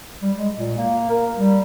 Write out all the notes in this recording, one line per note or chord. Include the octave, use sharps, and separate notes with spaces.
G3
G#3
A#2
A#3
A#4
G3